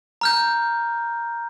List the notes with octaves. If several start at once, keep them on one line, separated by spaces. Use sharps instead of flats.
A#5 F6 G6